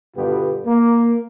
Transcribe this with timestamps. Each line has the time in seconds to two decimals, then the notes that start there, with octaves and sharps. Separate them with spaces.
0.17 G2 B2 D3 B3 F4 G4
0.66 A#3